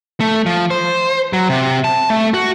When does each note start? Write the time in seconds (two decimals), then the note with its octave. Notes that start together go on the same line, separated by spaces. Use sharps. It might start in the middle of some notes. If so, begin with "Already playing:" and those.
0.20 A3
0.46 F3
0.71 C5
1.33 F#3
1.49 C3
1.84 A5
2.10 A3
2.34 F#4